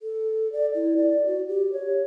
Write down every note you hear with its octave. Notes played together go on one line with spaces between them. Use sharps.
A4
D5
E4
D5
F#4
G4
C#5